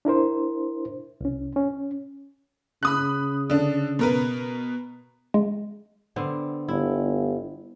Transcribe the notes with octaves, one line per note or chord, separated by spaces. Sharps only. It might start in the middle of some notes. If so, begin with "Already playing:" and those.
D4 E4 A#4 C5
C2 C#4
C#4
C#3 B5 D#6 F#6
D3 D4
B2 A#4 B4
G#3
D3 B3 C4
G1 E4